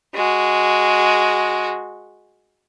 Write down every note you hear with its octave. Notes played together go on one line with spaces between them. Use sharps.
G#3 F#4